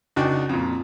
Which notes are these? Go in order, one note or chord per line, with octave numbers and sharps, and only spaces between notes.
C#2 D4 D#4 F#4 G5
F2 A#2